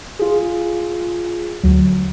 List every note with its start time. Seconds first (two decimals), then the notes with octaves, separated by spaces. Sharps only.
0.19 F4 G#4
1.63 D2 F#3